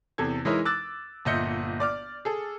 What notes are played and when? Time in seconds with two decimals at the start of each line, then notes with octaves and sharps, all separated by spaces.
0.18 E2 C3 A4 G#6
0.45 E3 G#3 D#4 E4 A#4 C#5
0.65 D6 E6 F#6 A6
1.25 G1 A#2 D#5 E5 G6 C#7
1.80 D5 D6 F6
2.25 G#4 A4